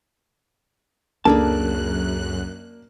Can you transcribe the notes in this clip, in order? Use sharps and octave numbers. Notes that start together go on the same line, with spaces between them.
C#2 F#2 A#3 D4 G#4 A4 A5 F#6